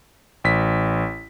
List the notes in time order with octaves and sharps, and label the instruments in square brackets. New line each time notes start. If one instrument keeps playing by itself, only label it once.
[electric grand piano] A1 B6